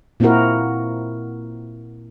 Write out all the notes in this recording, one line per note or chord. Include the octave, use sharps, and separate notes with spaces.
A#2 A#3 C4 E4 F#4 A#4